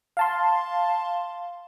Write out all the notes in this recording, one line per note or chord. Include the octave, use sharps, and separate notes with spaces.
F5 A5 C6